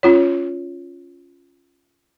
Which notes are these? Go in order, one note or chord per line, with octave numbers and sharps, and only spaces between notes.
C#4 F4 C#5